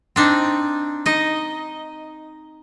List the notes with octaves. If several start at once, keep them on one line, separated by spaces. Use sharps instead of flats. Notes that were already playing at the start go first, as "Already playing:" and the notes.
C4 D4 D#4
D#4 D#5